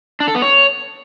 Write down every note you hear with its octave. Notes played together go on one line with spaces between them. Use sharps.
D4
A4
B3
C#5